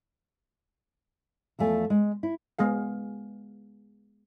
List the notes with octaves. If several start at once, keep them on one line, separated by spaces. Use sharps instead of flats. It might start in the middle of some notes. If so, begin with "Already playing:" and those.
E2 F3 A3 G#5
G#3
E4
G#3 B3 G#4 F5